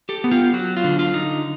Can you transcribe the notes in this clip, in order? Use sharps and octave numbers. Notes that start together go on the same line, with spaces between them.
G4 A4
B3
F4 G4
F#3 F#4
F4
D3
F4
D#4